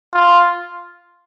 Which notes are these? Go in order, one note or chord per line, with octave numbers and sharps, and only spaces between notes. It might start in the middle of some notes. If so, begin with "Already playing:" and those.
F4